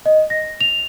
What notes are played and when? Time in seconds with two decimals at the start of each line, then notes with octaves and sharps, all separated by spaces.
0.06 D#5
0.30 A#6
0.61 F7